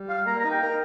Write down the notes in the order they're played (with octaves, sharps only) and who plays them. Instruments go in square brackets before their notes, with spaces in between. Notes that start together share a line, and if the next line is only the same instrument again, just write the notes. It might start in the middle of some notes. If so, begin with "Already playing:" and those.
Already playing: [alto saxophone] G3
[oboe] F5
[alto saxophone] A#3 [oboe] A#5
[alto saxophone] D#4 [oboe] A#5
[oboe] G5
[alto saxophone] A#4